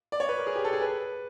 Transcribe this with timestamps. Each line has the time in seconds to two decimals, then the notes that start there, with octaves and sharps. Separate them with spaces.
0.12 D5
0.20 C#5
0.29 B4
0.38 A#4
0.47 G#4
0.55 G4
0.65 A4
0.73 G#4
0.82 B4